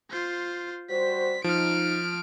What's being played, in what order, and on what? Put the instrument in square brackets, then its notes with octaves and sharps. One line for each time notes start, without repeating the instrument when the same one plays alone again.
[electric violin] F4 C5
[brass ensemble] G3 F#4 C5 [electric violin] B6
[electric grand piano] F3 [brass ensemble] D#4 [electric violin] F6 D7